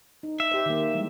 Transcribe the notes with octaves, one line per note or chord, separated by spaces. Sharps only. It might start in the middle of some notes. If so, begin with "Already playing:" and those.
D#4
E5
G4 C5
D#3 A#3
E3 G3 G#3